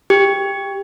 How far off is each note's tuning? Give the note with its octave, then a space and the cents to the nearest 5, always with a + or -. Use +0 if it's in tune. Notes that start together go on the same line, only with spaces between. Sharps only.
G4 +15